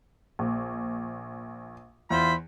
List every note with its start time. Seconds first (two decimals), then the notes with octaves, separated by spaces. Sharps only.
0.39 A#1
2.10 E2 E4 F4 C5 B5